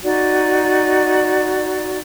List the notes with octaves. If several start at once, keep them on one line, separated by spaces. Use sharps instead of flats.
D#4 F#4 D5